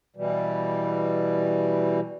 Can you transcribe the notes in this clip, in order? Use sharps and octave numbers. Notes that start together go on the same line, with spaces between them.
B2 E3 G3